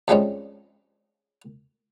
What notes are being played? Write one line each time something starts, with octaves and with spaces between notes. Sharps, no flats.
F2 F3 G3 G#3 C4 C#4